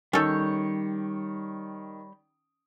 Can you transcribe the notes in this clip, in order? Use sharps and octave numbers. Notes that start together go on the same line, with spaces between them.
D#3 G3 C#4 A4 C#5 G6